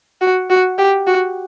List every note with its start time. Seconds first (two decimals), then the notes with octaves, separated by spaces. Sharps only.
0.21 F#4
0.50 F#4
0.79 G4
1.07 F#4